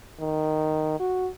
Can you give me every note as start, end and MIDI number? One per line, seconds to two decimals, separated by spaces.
0.20 0.95 51
1.00 1.29 66